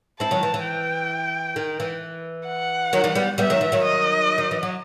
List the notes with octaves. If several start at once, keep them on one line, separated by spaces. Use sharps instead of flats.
C4 E4 A5
D#3 F#3
E3
E3
G5
D#3
E3
F#5
D#3 F#3
E3 G3
G3 B3
G3 B3 E5
D#3 F#3
E3
D#3 F#3
D#5
D#3
E3
F#3